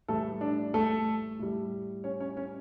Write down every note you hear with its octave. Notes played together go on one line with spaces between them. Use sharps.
A2 E3 G3 A3 A4
D4
A3 A4
A2 G3
C#4 C#5
C#4 C#5
C#4 C#5